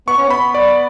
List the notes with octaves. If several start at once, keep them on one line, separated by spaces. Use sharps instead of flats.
B3 C#6
C#4
B3 B5
D5